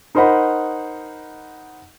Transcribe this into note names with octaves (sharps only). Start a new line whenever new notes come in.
D#4 A#4 C5 D#5 F#5 B5